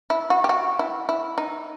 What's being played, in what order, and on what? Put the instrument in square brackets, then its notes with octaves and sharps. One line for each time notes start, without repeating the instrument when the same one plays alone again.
[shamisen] E4
F#4
G4
F#4
E4
E4
D#4